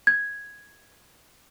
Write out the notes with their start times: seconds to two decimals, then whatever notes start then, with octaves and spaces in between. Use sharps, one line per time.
0.07 G#6